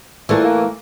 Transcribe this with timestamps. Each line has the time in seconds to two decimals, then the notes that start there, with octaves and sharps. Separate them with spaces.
0.29 A#2 E3 A3
0.44 A#3